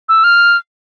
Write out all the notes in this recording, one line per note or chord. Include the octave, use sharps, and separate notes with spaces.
E6
F6